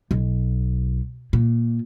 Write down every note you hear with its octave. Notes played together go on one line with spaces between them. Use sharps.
B1
A#2